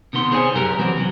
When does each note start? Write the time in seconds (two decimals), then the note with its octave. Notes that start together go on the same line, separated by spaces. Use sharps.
0.13 C3 D#3 B3 C6
0.32 G#4 C5 C#5 G#5
0.54 C2 F#2 G4 A#4 B4
0.79 E3 F#3 C4 F#4
0.97 C3 F#3